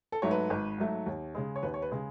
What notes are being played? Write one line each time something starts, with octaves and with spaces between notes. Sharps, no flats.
A4
G#2 F#3 A3 C#5
B4
G#1
G#2 F#3 A3
D#2
C#3 G#3
C#5
D#2 B4
C#5
B4
C#3 G#3